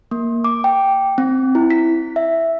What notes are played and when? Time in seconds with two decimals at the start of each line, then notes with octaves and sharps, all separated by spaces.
0.11 A#3
0.44 D6
0.64 G5
1.18 C4
1.55 E4
1.70 B6
2.16 E5